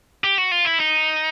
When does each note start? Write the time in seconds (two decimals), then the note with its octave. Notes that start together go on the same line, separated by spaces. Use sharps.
0.24 G4
0.38 F#4
0.51 F4
0.65 E4
0.79 D#4